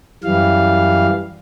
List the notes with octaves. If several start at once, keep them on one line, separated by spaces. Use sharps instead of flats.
F#2 E3 G3 F5